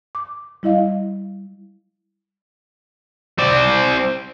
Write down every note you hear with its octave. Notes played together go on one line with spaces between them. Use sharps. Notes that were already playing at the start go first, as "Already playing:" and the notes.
D6
G3 E4 D#5 F5
C4 D5